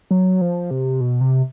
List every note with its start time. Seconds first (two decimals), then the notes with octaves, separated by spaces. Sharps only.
0.11 F#3
0.41 F3
0.71 C3
1.01 B2
1.21 C3